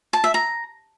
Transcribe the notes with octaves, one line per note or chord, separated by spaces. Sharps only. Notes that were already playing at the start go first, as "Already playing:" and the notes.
A5
E5
A#5